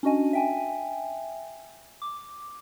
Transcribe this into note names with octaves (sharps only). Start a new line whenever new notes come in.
C#4 D4 F#4 D#5 G#5
E5 G5 G#5
D6